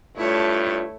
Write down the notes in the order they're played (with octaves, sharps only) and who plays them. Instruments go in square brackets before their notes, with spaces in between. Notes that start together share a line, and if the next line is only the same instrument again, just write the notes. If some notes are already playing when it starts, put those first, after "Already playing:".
[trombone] G2 [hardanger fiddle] A3 [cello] E4 C#5 [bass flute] F4